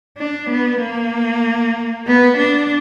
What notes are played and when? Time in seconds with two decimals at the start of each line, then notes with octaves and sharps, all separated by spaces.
0.18 D4
0.50 B3
0.82 A#3
2.08 B3
2.38 D4